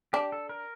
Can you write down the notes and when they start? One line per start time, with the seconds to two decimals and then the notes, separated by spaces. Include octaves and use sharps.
0.13 D4 G4
0.32 A4
0.49 A#4